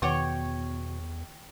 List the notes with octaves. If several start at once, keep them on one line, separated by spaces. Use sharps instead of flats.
E2 B2 D#3 C#5 F#5 G5 C#6 D6